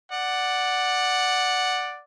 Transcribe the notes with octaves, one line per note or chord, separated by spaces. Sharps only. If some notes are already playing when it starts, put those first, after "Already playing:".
D5 F#5